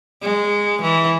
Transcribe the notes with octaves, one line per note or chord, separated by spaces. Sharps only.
G#3
E3